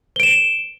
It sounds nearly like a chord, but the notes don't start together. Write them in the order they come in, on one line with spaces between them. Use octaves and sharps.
G7 D7 E7